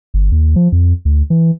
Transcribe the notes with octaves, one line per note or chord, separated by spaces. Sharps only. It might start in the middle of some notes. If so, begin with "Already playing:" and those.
G1
D#2
F3
F2
D2
E3